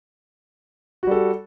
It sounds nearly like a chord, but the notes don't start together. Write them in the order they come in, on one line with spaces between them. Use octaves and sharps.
F#4 G3 A4